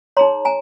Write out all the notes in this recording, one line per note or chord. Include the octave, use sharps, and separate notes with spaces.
D#4 G#4 C#5 A#5 C6
G#5 A#5